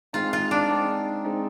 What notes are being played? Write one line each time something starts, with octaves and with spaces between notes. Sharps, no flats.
G#3 C4 D#4 F4
F4
D4
G#3 C4 D#4
G#3 C4 D#4